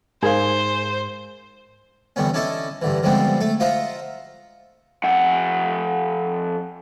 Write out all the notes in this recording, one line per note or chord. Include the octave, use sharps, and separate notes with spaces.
G#2 G#4 A#4 C5 F5
E2 D3 G3 B3 C#4
C#4 D4 E4 A4 D#5
G2 D3 E3
D3 F3 G3 G#3 B3 C4
A3 A4
F4 C5 D#5 E5 F#5 A#5
F2 F#5